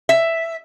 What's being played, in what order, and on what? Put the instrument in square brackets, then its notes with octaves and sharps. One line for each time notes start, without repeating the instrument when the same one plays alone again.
[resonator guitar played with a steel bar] E5